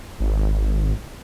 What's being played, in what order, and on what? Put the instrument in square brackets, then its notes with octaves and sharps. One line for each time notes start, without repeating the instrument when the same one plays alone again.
[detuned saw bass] G#1